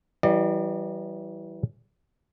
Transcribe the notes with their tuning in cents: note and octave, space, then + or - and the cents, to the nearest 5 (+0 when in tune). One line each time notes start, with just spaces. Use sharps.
E3 +0 G3 -35 D5 +45